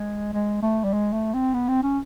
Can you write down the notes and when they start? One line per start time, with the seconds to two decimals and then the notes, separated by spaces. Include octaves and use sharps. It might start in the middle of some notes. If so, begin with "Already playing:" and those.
Already playing: G#3
0.33 G#3
0.62 A3
0.84 G3
0.93 G#3
1.13 A3
1.34 C4
1.54 B3
1.68 C4
1.83 C#4